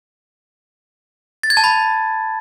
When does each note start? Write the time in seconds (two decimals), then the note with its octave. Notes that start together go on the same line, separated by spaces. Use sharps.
1.43 A6
1.50 G#6
1.57 A5
1.64 B5